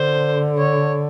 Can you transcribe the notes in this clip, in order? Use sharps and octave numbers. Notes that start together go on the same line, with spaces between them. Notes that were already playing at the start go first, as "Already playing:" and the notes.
Already playing: D3 C5
C#5